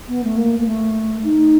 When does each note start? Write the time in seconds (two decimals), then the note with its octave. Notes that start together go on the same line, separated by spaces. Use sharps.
0.08 B3
0.24 A3
0.37 A#3
0.60 A#3
0.66 A3
1.24 D#4